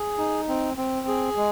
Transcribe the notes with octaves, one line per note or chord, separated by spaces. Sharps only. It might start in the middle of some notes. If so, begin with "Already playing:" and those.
Already playing: G#4
D#4
C4
C4
G#4
G#3